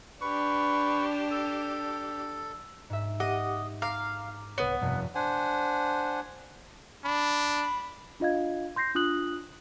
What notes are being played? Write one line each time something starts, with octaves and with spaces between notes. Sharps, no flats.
D4 G4 B4 C#6
A4
G#2 E5
G4 D#5 F#5 D6
F5 A#5 D6
C2 B3 B4 C#5
F1 G2
D4 C5 F#5 G#5
D4 B5
D4 F4 D#5 F5 G#6
C6 G6 A#6 C7
D4 F4 D#6 F#6 F#7